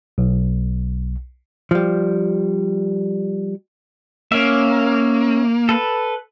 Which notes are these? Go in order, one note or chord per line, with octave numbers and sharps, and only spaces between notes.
B1
F3 G3
A#3 C#4 E5
A4 B4